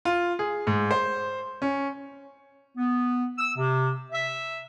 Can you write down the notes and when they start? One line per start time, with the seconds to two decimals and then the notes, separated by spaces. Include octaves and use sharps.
0.05 F4
0.39 G#4
0.67 G#2
0.91 C5
1.62 C#4
2.76 B3
3.39 E6
3.57 C3
4.12 E5